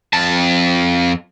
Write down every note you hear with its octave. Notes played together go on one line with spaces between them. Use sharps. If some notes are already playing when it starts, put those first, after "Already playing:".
F2 A5